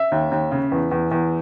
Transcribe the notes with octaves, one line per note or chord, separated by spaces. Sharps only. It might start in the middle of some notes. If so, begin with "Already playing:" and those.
Already playing: E5
D#2
D#2
C#3
E2
E2
E2